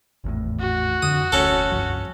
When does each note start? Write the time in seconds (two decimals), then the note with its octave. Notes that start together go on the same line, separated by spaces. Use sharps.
0.24 G#1 E2 A2
0.60 F#4
1.02 F2 D3 D#6
1.32 F1 D2 C#4 A4
1.72 C#2 G2 F3